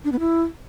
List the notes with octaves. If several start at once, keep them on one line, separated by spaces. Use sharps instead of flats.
D4
B3
E4